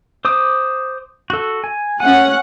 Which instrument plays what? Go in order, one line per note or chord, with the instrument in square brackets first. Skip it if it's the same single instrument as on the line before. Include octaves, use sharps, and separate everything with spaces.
[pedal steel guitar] C5 D6 D#6
F#4 A4
G#5
[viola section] C#4 F#5 [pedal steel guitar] G#5